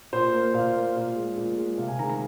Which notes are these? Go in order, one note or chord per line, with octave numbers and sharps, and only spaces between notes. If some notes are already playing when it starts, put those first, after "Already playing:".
A#2 C5
A#3
A#2 F5
A#3
A#2
G#3
A#2
G#3
C3 F5
G#5
D#3 G#3 A#5
A#5